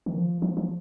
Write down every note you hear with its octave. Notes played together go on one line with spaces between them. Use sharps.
D#3
F3
F3
F3